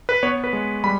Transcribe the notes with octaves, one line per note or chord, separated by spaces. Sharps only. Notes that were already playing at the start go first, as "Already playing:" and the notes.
B4
B3 C#5
B4
G#3
G3 B5